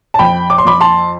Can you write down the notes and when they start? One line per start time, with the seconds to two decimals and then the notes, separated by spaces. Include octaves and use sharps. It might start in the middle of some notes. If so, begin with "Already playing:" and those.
0.14 A5
0.19 F2 G5 B5
0.50 D6
0.58 C6
0.65 F2 B5 D6
0.81 A5 C6